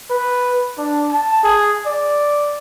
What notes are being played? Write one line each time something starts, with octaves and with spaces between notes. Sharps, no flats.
B4
D4
A5
G#4
D5